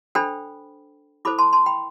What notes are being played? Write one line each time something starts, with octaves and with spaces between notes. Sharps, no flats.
D4 A4 C5 G5 B5
E4 A4 C5 B5 D6
A5 C6
A5 C6
G5 B5